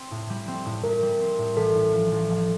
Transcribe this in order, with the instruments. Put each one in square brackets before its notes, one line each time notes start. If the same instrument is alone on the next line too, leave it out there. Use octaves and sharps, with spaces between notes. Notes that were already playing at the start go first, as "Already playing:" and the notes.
Already playing: [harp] C4
A2
G3
C4
A2
[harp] A2 [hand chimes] A#4
[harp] G3
C4
A2
[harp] A1 [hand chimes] A4
[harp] A2
F3
A1
A1